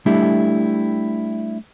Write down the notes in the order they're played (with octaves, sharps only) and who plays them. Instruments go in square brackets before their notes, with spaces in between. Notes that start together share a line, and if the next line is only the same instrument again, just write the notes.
[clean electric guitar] G3 A3 D4 E4 G4